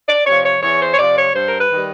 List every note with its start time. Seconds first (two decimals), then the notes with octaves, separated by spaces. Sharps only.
0.09 D5
0.26 C3 F3 C#5
0.45 C#5
0.63 E2 C#5
0.81 C5
0.92 C#5
0.99 C3 F3 D5
1.17 C#5
1.34 G2 C5
1.48 A#4
1.59 B4
1.71 D#3 G3